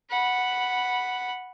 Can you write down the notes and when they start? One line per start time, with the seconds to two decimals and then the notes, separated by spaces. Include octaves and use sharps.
0.11 F#5 B5